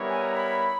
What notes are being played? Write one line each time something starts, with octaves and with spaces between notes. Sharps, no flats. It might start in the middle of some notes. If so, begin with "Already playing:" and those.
Already playing: G3 B3 E4 A#4 C#5
G#5
A#5
B5